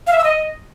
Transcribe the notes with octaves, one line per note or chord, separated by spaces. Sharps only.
F5
E5
E6
D#5